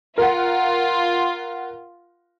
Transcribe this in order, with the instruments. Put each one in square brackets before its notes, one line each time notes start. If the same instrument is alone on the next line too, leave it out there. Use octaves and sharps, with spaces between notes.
[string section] F4 [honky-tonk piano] A#4 F#5